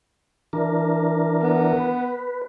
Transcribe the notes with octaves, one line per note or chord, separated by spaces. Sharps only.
E3 D4 A#4
B3
B4